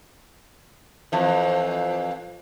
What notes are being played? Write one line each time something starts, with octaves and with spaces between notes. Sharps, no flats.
F2 E3